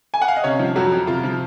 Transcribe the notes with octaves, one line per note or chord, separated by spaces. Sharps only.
G#5
F#5
F5
D#5
C3 C#4 C#5
F3
F2 F#3 F#4
F2
C3 F4
F3